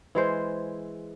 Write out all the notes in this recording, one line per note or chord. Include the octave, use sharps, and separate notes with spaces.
E3 G#3 C5